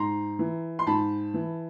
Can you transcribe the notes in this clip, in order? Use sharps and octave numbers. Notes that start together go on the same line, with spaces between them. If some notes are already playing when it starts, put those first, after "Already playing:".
Already playing: G#2 A#5 C6
E3
C6
G#2 A5 B5
E3